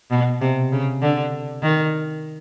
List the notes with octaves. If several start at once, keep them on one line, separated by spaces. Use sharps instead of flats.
B2
C3
C#3
D3
D#3